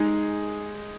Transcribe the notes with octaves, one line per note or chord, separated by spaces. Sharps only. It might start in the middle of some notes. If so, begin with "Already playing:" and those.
Already playing: G#3 D#4 G#4